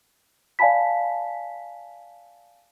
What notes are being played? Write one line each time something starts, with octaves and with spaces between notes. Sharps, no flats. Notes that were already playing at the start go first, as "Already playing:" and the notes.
D5 F5 G#5 A5 B5 B6